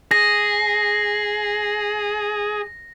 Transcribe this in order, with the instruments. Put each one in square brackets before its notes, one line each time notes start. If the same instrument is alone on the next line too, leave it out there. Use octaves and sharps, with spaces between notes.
[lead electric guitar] G#4 [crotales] A#6